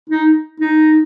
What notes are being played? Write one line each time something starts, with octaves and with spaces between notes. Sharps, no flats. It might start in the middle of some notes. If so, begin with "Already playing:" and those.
D#4
D#4